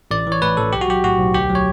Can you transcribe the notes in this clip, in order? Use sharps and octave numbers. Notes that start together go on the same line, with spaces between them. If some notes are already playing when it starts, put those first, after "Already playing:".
A1 D5
E3
C#5
A2 B4
A1 A4
B1 G4
F#4
F#3 G4
A2 F#4
B1
D2 G4
F#3
C#5